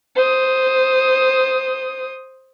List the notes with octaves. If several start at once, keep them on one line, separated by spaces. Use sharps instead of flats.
C5 D#6